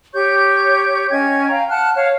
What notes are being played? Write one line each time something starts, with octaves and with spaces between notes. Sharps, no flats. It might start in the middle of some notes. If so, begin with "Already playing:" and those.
G4 C#5 C#6 G6
C#4 D#5 G5 G#6
F5 G5 A#5
F#5 A5 F6 F#6
C#5 F5 F6